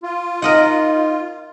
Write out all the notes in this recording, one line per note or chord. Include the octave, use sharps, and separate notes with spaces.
F4
D#4 A#4 D#5 F#5